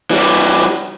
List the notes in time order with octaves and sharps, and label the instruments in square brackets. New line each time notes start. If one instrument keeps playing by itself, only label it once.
[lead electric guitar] E3 G3